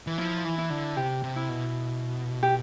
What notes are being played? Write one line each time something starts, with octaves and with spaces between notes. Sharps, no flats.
E3
F3 E4
E3
E4
D3
C3 G4
C3
E4
B2
G4